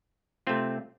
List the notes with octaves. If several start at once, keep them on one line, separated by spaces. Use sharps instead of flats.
C3 A3 C4 F4